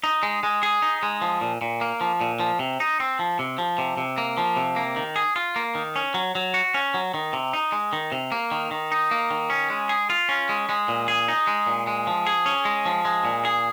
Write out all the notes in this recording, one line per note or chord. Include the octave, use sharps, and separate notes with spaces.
D#4
G#3
G#3
G#4
D#4
G#3
F3
A#2
A#2
A#3
F3
A#2
F3
C3
D#4
C4
F3
C3
F3
C3
C3
A#3
F3
C3
A#3
D#3
G#4
F4
A#3
D#3
C#4
F#3
F#3
F#4
C#4
F#3
D#3
C3
D#4
G#3
D#3
C3
A#3
D#3
D#3
D#4
A#3
D#3
C#4
G#3
G#4
F4
C#4
G#3
G#3
A#2
G#4
D#4
G#3
A#2
G#3
F3
G#4
C#4
G#3
F3
G#3
A#2
G#4